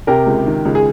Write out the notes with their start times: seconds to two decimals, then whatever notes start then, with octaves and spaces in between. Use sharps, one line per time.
0.07 C3 G4 A#4
0.26 C#2
0.46 D#3
0.65 C#2
0.75 G#4